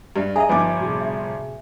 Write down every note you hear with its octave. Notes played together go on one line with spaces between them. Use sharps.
G2 G4 B4 D#5
G#4 D#5 E5 G#5 A#5
G1 F3 D#4 B4 G#5 D6
A2 C3 F#4 G#4
E5